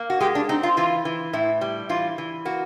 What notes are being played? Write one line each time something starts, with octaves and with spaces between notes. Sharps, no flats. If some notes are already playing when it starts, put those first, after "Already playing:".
Already playing: A#3
F#4
G#3 G4
D4
C4 D#4
F4
E3 F4
E3
A2 E4
G3
E3 F4
E3
A#3 F#4